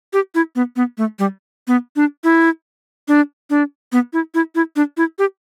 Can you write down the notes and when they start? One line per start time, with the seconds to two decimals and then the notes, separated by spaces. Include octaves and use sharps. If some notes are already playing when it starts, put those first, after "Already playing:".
0.13 G4
0.35 E4
0.56 B3
0.76 B3
0.98 A3
1.19 G3
1.68 B3
1.96 D4
2.24 E4
3.08 D4
3.50 D4
3.92 B3
4.13 E4
4.35 E4
4.55 E4
4.76 D4
4.97 E4
5.19 G4